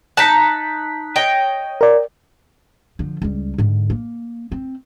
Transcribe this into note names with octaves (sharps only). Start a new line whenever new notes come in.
D#4 A5 F#6 B6
C#5 D#5 G5
A#4 D5
D3 F3
C#2 G3
G#2 D3
A#3
C4